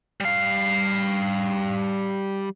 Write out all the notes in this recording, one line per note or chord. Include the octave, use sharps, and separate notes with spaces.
G3 F5